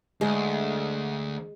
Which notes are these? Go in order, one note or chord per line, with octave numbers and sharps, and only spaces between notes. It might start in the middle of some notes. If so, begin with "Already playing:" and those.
D2 G#3